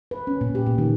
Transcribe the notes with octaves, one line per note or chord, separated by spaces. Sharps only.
B4
C#4
A#2
G4
A#2
D#3